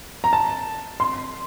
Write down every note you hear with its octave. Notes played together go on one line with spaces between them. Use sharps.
A#5
A5
C6